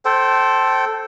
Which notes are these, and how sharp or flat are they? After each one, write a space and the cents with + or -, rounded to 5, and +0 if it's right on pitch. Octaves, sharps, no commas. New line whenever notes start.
A4 +0 C5 +10 G5 -30